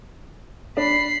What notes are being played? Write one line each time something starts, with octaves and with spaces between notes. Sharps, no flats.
D4 B5 C7